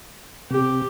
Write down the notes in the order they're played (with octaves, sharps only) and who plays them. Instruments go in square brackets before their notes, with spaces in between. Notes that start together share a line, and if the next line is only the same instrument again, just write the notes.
[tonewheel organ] C3 [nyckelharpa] G4